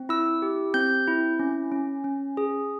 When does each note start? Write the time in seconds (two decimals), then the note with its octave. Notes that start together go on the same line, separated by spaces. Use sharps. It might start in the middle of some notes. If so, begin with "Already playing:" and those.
Already playing: C4
0.09 E4 E6
0.42 G4
0.74 C4 G6
1.07 E4
1.39 C#4
1.72 C#4
2.04 C#4
2.37 G#4